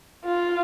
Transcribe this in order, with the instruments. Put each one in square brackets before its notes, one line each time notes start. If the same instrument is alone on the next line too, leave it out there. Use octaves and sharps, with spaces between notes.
[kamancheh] F4